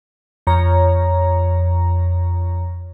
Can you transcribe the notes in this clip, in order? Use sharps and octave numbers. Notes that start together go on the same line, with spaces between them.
F2 C#5 A#5